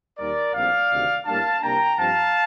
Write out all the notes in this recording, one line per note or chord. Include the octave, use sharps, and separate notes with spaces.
D#2 D#3 G3 A#4 D5
A#1 A2 G3 C4 D5 F5
D2 C3 D#3
A2 G3 A#3 D4 F5 A5
C2 C3 G3 A#3 D4 G5 A#5
G2 F3 C4 F5 A5